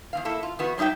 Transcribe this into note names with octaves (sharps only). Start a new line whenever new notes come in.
E2 E3 F5
A#3 E4 A4
F4
E2 B3 F#4
F#3 G3 D#4 E5 G5